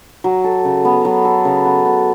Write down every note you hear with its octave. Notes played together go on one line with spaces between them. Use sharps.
F#3
A4
C#3
B3
F#3
A4
C#3
B3
B3